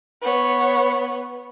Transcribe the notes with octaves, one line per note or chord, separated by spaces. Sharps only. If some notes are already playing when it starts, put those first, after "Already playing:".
B3 C#5